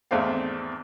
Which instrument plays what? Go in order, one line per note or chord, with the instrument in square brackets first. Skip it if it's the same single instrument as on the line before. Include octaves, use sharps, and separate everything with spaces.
[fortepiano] G#1 E2 A3 C4 D4 F5